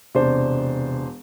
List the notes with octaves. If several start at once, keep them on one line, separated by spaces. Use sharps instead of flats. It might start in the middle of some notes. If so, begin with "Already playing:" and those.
E1 C3 D4 C5